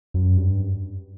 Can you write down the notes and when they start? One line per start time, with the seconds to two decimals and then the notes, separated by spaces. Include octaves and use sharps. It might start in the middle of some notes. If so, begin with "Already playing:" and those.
0.14 F#2
0.37 G2